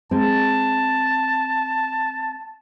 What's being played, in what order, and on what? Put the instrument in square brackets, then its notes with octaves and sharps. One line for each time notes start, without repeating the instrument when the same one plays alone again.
[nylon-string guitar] G#3 C4 [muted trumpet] A5